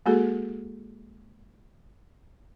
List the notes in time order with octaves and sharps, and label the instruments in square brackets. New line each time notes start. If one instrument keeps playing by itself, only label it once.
[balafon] G#3 A#3 F#4 G#4 A4